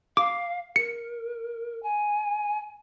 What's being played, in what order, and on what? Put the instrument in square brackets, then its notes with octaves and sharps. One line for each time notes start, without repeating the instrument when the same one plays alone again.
[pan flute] F5 [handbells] D6
[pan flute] A#4 [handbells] C#7
[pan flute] G#5